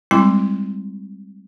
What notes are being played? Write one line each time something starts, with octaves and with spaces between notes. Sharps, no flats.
G3 G#3 C4 E4 C6